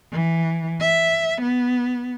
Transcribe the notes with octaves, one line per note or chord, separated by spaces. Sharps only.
E3
E5
B3